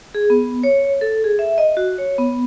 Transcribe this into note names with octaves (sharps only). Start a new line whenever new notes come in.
G#4
B3
C#5
A4
G#4
E5
D#5
F#4
C#5
B3